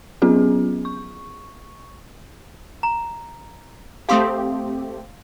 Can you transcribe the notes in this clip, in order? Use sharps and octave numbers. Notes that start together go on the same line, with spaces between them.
F#3 B3 C#4 F4 G#4
C#6
A#5
A3 C4 G4 F5 C6 D#6